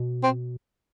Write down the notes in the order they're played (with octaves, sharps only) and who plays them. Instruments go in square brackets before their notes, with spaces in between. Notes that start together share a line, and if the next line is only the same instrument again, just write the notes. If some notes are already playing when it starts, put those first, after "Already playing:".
Already playing: [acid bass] B2
[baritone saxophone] C4